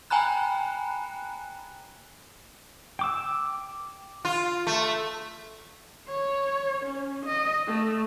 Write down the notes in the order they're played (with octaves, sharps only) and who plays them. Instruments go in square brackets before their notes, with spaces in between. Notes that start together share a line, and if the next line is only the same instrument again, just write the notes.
[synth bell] G5 G#5 A#5 B5 F#6
[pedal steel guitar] G5 D6 E6
[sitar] F4
A3
[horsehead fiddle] C#5
C#4
D#5
A3